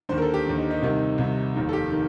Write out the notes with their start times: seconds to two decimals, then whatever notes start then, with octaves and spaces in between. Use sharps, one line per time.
0.09 D#2 D3 C5
0.18 A#4
0.22 A4
0.34 G4
0.46 D#2 D3
0.58 D#4
0.71 D#4
0.82 C2 C3 D#3
1.18 C2 C3 D#3
1.55 F1 D#2 D#3
1.69 A4
1.73 G4
1.91 D#3